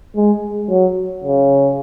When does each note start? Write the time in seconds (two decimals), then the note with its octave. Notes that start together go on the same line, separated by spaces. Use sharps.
0.16 G#3
0.70 F#3
1.24 C#3